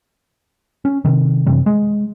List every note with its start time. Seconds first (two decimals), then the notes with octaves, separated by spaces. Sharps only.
0.85 C#4
1.05 C3 D#3
1.46 F#2 C3 E3
1.66 G#3